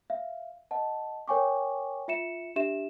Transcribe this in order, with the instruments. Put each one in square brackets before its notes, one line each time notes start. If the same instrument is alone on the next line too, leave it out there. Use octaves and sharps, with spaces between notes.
[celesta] E5 F5
D#5 F#5 A5
A#4 C#5 G5 G#5 C#6 D6
F4 E5 C#7 E7
D4 G4 E5 E7